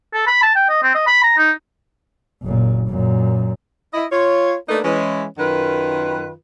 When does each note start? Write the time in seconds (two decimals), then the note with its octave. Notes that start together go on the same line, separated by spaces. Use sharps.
0.14 A4
0.27 B5
0.42 A5
0.55 G5
0.69 D#5
0.83 C4
0.94 D#5
1.07 B5
1.23 A#5
1.37 D#4
2.43 F#1 A#2
2.87 F#2 A#2
3.94 E4 D#5
4.12 F4 C#5
4.69 A3 A#3 D4 D#4 A4 B4
4.84 E3 G#3 C#4
5.39 F#2 D#3 F4 B4